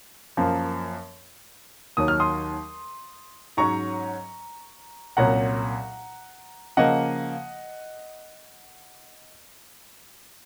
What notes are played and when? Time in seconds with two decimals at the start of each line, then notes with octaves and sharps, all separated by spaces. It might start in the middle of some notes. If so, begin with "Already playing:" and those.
0.37 F#2 F3 A#3
1.97 D#2 D#3 F#3 D#6
2.08 F6
2.20 C6 D#6
3.57 G#2 F#3 C#4 A#5 C#6
5.17 C2 A#2 F#3 C#4 F#5 A#5
6.77 C#3 F3 A#3 D#5 F#5